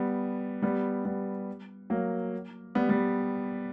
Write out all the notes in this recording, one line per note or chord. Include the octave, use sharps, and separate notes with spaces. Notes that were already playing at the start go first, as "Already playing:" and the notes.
Already playing: G3 B3
G3 B3
G3 B3
F#3 A#3
G3 B3
G3 B3